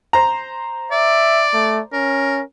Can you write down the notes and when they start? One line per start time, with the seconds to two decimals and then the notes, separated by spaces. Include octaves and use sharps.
0.13 C5 A#5
0.91 D5 E5
1.54 A3
1.93 C#4 A#4